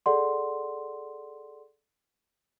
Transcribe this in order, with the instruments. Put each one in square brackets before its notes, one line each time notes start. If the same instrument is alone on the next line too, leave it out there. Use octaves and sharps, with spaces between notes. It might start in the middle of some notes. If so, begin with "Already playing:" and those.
[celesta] G#4 A4 D5 F#5 C6